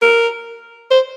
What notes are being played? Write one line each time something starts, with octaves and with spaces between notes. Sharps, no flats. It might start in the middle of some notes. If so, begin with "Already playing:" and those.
A#4
C5